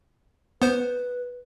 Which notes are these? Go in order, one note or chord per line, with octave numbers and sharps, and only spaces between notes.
B3 B4 C5